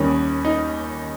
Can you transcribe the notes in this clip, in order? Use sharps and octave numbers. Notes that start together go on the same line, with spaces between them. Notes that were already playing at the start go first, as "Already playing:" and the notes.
Already playing: D#2 D#3 G3 C#4
D#4